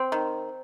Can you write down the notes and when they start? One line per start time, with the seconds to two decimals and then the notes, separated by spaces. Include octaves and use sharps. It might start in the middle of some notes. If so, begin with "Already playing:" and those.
Already playing: C4
0.12 D#3